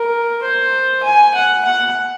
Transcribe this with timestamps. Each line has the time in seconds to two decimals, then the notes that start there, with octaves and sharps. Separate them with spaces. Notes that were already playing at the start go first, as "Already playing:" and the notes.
Already playing: A#4
0.42 C5
1.03 G#5
1.35 F#5
1.65 F#5